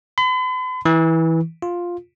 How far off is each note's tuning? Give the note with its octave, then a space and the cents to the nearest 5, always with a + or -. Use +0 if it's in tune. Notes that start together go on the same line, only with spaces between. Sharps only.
B5 +45
E3 -15
F4 +5